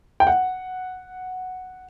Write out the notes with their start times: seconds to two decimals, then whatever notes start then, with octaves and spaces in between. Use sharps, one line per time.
0.20 G5
0.27 F#5